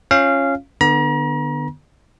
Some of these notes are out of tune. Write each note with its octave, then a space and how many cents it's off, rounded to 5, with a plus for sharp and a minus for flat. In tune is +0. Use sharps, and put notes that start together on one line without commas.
C#4 -10 F4 +0 F5 -15
D3 +25 B3 -5 A#5 +40